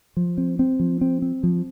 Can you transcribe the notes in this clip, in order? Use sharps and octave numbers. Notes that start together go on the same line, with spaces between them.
F3
C4
C4
F3
C4
C4
F3